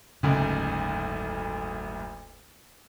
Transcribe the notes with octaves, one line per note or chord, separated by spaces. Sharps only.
F#1 D2 G#2 C#3